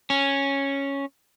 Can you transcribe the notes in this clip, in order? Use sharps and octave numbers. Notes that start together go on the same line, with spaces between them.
C#4